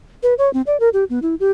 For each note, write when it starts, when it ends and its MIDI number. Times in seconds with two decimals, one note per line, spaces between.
0.23 0.34 71
0.38 0.52 73
0.53 0.62 60
0.67 0.77 74
0.80 0.89 70
0.93 1.04 67
1.10 1.19 59
1.22 1.35 64
1.40 1.51 67